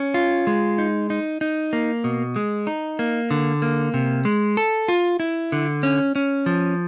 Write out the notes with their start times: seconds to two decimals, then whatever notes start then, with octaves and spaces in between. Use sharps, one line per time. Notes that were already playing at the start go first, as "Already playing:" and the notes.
Already playing: C#4
0.14 F4
0.47 G#3
0.78 D#4
1.10 D#4
1.41 D#4
1.73 A#3
2.04 B2
2.36 G#3
2.67 D#4
2.99 A#3
3.31 D3
3.62 A#3
3.94 C3
4.25 G#3
4.57 A4
4.88 F4
5.20 E4
5.52 D3
5.83 C#4
6.16 C#4
6.46 F3